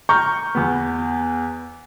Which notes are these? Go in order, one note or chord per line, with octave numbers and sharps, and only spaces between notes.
A#5 C#6 F6 G6
E2 B3